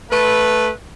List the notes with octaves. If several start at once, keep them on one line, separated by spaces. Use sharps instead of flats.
A3 B4